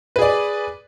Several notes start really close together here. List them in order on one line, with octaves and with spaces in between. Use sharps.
B4 G#4 D5